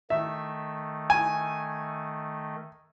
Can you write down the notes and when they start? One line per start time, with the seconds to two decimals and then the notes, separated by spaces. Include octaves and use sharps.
0.10 D#3 A3 E5
1.10 G#5